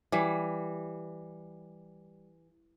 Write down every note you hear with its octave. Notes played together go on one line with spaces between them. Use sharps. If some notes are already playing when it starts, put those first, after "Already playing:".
E3 G3